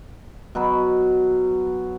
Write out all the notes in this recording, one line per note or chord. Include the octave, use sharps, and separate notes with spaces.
B2 F#3 B5